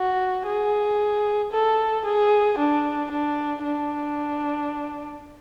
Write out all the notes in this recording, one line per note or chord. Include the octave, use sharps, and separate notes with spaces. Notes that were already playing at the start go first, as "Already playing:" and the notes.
Already playing: F#4
G#4
A4
G#4
D4
D4
D4